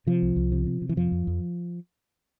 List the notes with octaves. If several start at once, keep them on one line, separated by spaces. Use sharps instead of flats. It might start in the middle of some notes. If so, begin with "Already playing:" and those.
C3 F3
C2
C2
C3
C3
C3
E3
F2 F3
F2
F2